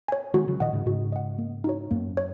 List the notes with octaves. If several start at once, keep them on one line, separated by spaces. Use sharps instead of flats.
C#5 G#5
D#3 G#3 F#4
C#3 F#3
A#2 D#3 D#5 F#5
G#2 C#3
G#2 C#3 F#4
D#5 F#5
A#3
D#4 F#4 C#5
F#2 A#3
C#5